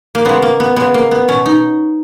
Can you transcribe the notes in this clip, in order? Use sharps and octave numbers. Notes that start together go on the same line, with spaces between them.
A#3
C#3 G#3 B3
A#3
B3
C#3 G#3 B3
A#3
B3
B2 F#3 C#4
D#4